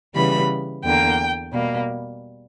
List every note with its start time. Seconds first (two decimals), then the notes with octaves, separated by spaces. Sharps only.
0.15 C#3 E3 G3 B3 B5
0.84 E2 D3 A#3 G5
1.53 B2 G3 A#3